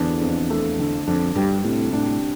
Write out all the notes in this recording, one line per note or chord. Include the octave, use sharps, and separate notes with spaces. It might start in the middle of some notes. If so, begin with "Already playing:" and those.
Already playing: E2 D3 D4
F2
A3
D3
F2 D4
G2 G3
A2 C3
A2 D4